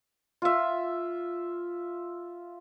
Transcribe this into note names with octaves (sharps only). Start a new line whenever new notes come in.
F4 E5